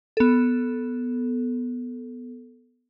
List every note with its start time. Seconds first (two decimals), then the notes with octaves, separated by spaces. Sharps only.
0.17 B3 A4